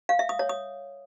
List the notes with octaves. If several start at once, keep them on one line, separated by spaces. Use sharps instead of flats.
F5
E5
D#6
C#5
D#6